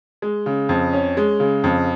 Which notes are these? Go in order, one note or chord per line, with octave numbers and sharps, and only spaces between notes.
G#3
C#3
F2
C#4
G#3
C#3
F2